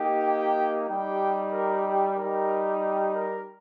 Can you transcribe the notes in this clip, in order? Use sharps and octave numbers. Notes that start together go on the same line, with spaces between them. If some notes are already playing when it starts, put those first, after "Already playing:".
Already playing: A#3 D#4 G4
G5
G3 D#4 G4 G5
A#4
G4
G3 D#4 G4 A#4
G4
A#4